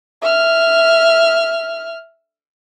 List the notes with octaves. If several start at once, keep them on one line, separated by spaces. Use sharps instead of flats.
E5 F6